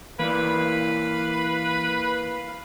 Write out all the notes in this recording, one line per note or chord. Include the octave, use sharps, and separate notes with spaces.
E3 A#3 E4 B4 D5 F5 B5